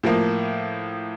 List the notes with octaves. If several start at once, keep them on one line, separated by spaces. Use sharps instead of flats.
A2 F3 A#3